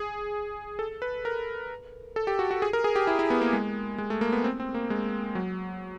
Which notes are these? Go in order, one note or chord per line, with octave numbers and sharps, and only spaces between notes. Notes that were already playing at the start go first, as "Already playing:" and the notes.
Already playing: G#4
A4
B4
A#4
A4
G4
F#4
F#4
G#4
A#4
G#4
G4
E4
E4
B3
A#3
G#3
G#3
A3
A#3
B3
C4
C4
A#3
G#3
F#3